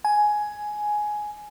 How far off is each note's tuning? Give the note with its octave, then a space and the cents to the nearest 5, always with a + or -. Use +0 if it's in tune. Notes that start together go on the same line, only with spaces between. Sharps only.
G#5 +10